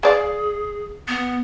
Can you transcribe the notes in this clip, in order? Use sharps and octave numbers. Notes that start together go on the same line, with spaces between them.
G#3 G#4 D5 F5
B3